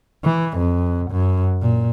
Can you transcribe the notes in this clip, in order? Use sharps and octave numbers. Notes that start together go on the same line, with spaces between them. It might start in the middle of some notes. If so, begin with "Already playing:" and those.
E3
F2
F#2
A#2